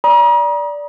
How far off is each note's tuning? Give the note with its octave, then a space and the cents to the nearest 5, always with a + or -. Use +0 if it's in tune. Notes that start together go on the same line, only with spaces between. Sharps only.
D5 -10 A#5 +40 D#6 +0